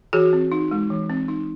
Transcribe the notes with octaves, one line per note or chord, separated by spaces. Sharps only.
E3 F#4 G#4
C4
D#4
G#3
E3
C4
D#4